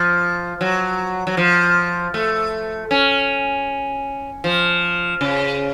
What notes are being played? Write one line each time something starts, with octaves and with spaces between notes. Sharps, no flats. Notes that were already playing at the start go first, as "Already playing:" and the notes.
Already playing: F3
F#3
F#3
F3
A3
C#4
F3
C#3